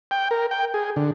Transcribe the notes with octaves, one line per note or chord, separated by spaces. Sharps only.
G5
A#4
G5
G#4
D3